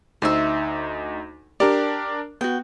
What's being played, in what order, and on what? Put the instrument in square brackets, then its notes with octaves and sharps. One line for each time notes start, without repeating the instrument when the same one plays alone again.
[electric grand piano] D2 D#4 [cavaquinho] C5 E5
[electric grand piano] D4 A#4 D5 [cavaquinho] G4
[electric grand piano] B3 [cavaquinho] F#4 G5